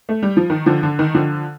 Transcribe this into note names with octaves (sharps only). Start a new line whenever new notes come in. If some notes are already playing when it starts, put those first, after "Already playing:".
A3
G3
F3
D#3
D3 F3
D3
D#3
D3 F3